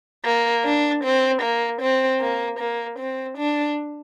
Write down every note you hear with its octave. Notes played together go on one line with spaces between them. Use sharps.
A#3
D4
C4
A#3
C4
A#3
A#3
C4
D4